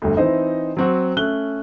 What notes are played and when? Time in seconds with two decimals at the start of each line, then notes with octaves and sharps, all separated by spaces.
0.02 G1 D2
0.17 E3 C4 D#4 C5 D#5
0.77 F#3 C4 F#4
1.17 A3 C#4 F#6 G7